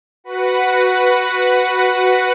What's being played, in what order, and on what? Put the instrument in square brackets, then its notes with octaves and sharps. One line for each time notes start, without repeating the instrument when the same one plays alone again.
[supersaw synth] F#4 B4 F#5